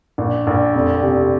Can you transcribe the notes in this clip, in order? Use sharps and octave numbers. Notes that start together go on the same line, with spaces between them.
A#1
A#1
F1
C3